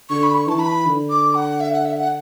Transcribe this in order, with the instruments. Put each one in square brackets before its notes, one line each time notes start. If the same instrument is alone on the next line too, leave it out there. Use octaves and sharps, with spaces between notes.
[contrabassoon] D3 [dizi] C#6
[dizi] B5
C#6
[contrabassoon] E3 [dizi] A5
[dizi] B5
[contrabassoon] D3
[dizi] D6
F#5
E5
F#5
E5
F#5